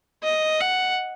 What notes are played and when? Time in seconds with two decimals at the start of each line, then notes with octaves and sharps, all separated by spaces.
0.23 D#5
0.60 F#5